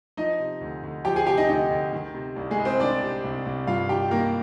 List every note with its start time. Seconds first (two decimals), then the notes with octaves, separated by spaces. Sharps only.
0.17 F3 D#4 D#5
0.40 C3
0.61 D2
0.83 D2
1.05 F3 G4 G5
1.16 G#4 G#5
1.26 C3 G4 G5
1.37 D#4 D#5
1.48 D2 D#4 D#5
1.70 D2
1.93 D#3
2.14 C3
2.36 C2
2.51 G#3 G#4
2.58 C2
2.65 C4 C5
2.80 D#3 D4 D5
3.02 C3
3.24 C2
3.46 C2
3.67 G2 F4 F5
3.89 D#3 G4 G5
4.11 D#3 A#3 A#4